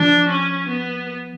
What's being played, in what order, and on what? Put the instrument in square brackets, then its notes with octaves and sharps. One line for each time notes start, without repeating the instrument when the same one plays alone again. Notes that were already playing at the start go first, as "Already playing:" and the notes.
Already playing: [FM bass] F3 [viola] D4
[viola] C#4
B3